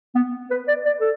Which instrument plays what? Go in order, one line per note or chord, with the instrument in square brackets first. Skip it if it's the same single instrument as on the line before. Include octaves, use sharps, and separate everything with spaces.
[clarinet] B3
B4
D5
D5
A4